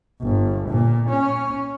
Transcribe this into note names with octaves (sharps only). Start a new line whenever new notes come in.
G1
A#2
C#4